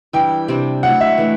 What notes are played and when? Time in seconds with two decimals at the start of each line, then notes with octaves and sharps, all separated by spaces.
0.13 E3 G3 D4 G4 G5
0.48 C3 G3 D4
0.83 F#3 A3 E4 F#5
1.00 E5
1.18 E3 A3 D4